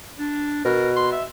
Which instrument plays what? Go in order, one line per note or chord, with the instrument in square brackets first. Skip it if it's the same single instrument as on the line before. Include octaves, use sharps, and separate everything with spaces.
[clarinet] D4
[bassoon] B2 [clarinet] A#4
[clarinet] C6
E5